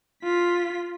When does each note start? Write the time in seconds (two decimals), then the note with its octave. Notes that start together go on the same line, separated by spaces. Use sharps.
0.24 F4 B6